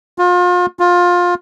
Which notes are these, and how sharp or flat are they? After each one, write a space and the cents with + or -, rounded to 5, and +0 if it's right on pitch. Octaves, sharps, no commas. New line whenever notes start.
F4 +35
F4 +20